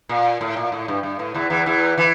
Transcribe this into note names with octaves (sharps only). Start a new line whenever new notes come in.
A#2
A2
A#2
A2
G2
G2
A2
E2 E3
E2 E3
E2 E3
E3